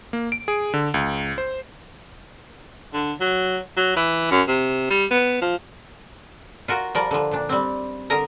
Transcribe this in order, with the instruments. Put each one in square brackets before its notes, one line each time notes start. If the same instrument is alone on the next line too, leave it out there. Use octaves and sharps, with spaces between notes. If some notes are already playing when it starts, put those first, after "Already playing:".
[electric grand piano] A#3
D7
G#4
D3
C#2
C5
[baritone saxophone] D3
F#3
F#3
E3
F#2
C3
G3
B3
F3
[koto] F4 F#4 A#4
F3 G3 A#4 D5
D3 F3
A#2 D4
G3 C4
D3 A#4 D#5 A#5